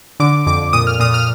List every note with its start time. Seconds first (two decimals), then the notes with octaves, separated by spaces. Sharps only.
0.20 D3 D6
0.46 F2 D6
0.73 A#2 D#6
0.87 F6
1.00 A#2 D#6
1.14 F6